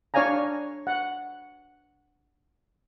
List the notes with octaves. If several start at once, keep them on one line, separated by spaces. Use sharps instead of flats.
D4 C#5 D5 F5 G#5 A#5
F#5